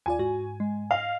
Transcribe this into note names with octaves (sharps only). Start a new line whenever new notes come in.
D#2 F4 D5 G#5
G#2 F#4
G#3
D#5 F5